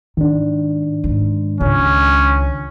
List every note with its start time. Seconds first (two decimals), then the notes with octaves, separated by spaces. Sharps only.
0.17 G#2 D#3 D4
1.04 G#2
1.61 C#2 C#4